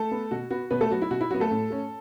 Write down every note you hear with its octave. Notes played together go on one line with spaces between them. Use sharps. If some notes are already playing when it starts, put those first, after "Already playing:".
Already playing: A3 A4
B3
B2 F#4
B3 F#4
B2 B3 B4
A3 A4
F#3 B3 F#4
E4
B2 F#4
E4
F#3 B3 F#4
A3 A4
A2
A3 C#4